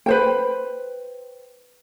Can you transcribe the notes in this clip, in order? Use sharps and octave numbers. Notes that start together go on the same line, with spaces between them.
B4 C5 G5